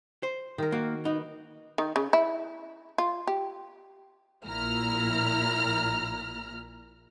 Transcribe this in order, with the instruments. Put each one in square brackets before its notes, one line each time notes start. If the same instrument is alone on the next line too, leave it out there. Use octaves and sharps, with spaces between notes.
[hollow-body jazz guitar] C5
[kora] D#3 A#4
[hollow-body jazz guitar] A#3 [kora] F#4
[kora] B3 [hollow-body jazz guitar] D#4
[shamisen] D#3
C#3
E4
F4
G4
[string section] A#1 A#2 E4 A#5 F6